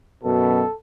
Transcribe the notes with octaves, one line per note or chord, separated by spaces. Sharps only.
F#2 B2 A4